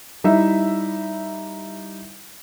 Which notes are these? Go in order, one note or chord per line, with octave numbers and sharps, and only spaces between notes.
G3 D#4 E4 E5